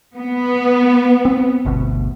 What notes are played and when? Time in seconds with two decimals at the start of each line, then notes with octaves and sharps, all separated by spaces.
0.17 B3
1.25 C4
1.65 G1 D2 B2